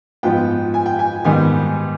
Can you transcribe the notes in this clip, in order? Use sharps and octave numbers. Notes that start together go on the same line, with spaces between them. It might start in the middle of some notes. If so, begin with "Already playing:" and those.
G#2 F3 B3 G5
G#5
G5
G#5
G#2 D#3 G3 B3 G#5